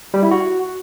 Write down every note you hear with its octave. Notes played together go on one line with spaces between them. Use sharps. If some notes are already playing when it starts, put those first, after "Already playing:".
G3
E4
F#4